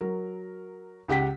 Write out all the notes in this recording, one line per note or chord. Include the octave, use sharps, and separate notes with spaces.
F#3 A#4
C#2 G4 F#5 G5 B6